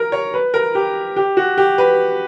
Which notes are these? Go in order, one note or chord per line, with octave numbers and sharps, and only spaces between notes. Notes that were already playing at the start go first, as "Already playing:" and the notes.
Already playing: A#4
C#5
B4
A#4
G4
G4
F#4
G4
B4